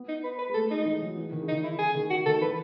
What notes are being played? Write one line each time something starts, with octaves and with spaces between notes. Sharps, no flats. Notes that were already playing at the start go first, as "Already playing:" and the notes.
Already playing: B3
D#4
B4
B4
G#3
A3 A4
G#3 D#4
E3
F#3
E3
D#3
C#3
D#4
D#3
E4
C#3 G#4
C#3
D#3
C#3 F#4
D#3 A4
E3 B4